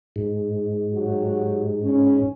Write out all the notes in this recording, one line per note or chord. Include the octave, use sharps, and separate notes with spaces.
G#2
F#3 F#4 G4
C#4